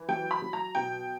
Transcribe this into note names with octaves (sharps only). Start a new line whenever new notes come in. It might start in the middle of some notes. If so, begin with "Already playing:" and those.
Already playing: E3
F#3 G5
B5
F#3
A#5
B2 G5